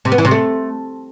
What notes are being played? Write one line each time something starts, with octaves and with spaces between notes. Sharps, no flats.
C3
B3
E3
C3
A3